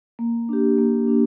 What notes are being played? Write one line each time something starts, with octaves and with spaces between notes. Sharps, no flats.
A#3
D4 G4
A#3
D4